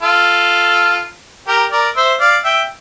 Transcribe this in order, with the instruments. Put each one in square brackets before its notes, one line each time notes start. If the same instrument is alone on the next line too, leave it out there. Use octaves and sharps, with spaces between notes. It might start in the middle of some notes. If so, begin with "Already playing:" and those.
[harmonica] F4 A4
G4 A#4
A#4 D5
C5 E5
D5 F5
E5 G5